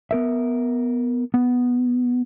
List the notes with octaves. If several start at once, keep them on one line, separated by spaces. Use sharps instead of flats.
B3 A#4 E5
B3